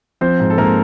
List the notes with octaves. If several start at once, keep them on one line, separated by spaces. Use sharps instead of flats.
F3 C4 C5
G#2
A4
G#2 A#3 A#4